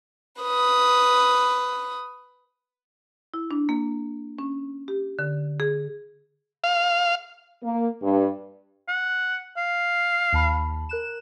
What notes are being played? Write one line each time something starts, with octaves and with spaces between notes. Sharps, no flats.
B4 D#6
E4
D4
A#3
C#4
G4
D3
G#4
F5
A#3
G2
F#5
F5
D#2 A5 B5
A#4 F#6 E7